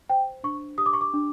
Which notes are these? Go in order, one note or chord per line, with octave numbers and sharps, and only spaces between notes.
C5 G5
D4 C#6
G4 D#6
D6
C#6
D6
D4